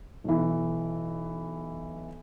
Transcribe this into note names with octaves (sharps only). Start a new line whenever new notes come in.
B1 E3